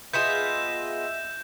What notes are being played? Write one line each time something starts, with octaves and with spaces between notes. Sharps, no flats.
B3 F4 G#4 D#5 E5 G6 E7